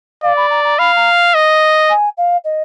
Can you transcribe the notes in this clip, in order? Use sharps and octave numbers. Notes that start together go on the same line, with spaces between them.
D5 F5
B5
A#5
A#5
F5 B5
A#5
D#5
G#5
F5
D#5